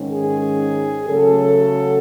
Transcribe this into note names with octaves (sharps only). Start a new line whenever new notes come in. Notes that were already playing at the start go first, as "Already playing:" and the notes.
Already playing: G#2 D#3 G#3 C#4
G#4
C#3 F#3 A3 C#4 A4